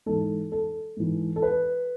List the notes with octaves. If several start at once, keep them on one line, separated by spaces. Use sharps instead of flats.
G#2 E3 A4
A4
G#2 E3
A4
B4